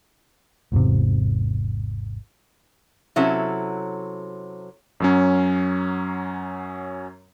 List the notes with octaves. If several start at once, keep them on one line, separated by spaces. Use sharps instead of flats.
G#1 E2 G#2 C3
C3 F#3 C#4 E4 A4
F#2 F#3 C#4